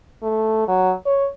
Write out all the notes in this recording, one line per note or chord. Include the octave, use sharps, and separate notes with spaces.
A3
F#3
C#5